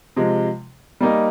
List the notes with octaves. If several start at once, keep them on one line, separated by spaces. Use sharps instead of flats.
C3 F3 G#3
G3 A#3 D#4